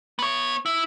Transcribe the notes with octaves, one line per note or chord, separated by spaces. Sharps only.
B3 C#5
E4